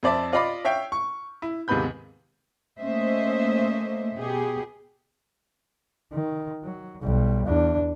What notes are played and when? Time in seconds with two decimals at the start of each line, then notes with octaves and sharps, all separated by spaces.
0.03 F2 C5 D5 E5 A5
0.32 F4 D5 D#5 F5 B5 D6
0.65 C#5 E5 F5 G5
0.92 C#6
1.42 E4
1.68 D#2 G#2 C3 B3 B5 G6
2.79 A3 A#3 C#4 C5 D#5 E5
4.16 B2 B3 G4 G#4
6.13 D#3
6.64 F#3
7.02 B1 G3
7.46 E2 D4